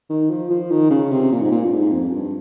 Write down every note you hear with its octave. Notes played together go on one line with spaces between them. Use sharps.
D#3
F3
F3
D#3
C#3
C3
A#2
G#2
A#2
G2
G#2
F2
G2